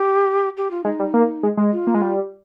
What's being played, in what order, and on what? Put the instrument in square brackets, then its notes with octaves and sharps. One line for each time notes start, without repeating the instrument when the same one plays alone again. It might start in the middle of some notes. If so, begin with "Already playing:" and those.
Already playing: [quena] G4
G4
F4
[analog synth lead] G#3 [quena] D#4
[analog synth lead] G3
A#3
G#3
G#3
[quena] F4
[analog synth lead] A#3
G#3
G3